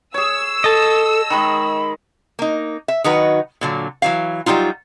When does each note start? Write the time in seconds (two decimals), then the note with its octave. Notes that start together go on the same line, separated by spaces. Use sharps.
0.14 G#4 C#5 E6
0.64 A4 D#5 A5
1.30 D#3 G#3 B5
2.39 A#3 D#4
2.88 E5
3.04 D#3 F#3 D#4 F#4 B4
3.61 A#2 D3 F#3
4.02 E3 F#3 F5
4.46 F#3 G3 C4 D#4 F4